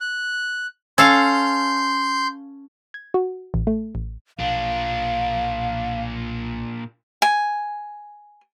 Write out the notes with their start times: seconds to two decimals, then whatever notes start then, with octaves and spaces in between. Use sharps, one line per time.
0.01 F#6
0.98 C#4 A4 F5 C6 G6
2.94 G#6
3.14 F#4
3.54 A1
3.67 A3
3.95 A1
4.39 B1 A#2 F3 D4 F5
7.22 G#5